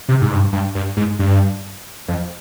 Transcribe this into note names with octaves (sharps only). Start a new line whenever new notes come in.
C3
G#2
G2
G2
G2
G#2
G2
F2